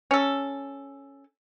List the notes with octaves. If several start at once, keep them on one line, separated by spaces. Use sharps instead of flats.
C#4 A4